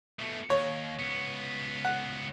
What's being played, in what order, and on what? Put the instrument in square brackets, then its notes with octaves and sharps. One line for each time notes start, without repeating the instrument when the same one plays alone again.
[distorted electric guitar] B2 A3
[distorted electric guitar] D#2 [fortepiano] C#5
[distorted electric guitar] C#2 B3
[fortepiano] F#5